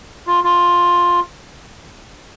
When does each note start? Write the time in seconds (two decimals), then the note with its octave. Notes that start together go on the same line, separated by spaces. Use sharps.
0.27 F4
0.44 F4